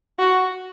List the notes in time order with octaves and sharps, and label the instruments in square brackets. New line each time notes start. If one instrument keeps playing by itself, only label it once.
[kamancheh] F#4